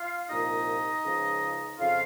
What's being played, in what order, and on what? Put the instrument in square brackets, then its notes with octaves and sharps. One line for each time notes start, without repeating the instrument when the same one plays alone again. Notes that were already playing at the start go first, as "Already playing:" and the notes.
Already playing: [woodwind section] F4 F5
C2 A#2 F3 D#4 D#5
C#2 C#3 F3
F2 C#3 F3 F4 F5